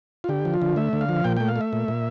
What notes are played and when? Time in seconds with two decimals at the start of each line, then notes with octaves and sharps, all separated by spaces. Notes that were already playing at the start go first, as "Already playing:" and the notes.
0.24 F4
0.29 D3 G4
0.45 F3
0.54 F4
0.62 D3
0.76 A3 E5
0.93 D3
1.01 F5
1.09 F3
1.24 A#2 G5
1.37 A3 G5
1.48 F5
1.56 A3
1.61 E5
1.73 A#2
1.88 A#2